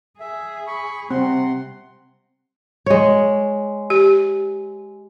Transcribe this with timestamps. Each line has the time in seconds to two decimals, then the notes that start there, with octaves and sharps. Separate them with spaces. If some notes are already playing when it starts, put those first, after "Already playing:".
0.20 G#4 E5
0.67 B5 C#6
1.11 C3 G3 C4 F#5 C6
2.86 G#3 C#5
3.90 G4